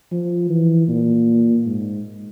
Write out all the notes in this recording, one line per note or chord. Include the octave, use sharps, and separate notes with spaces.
F3
E3
A#2
G#2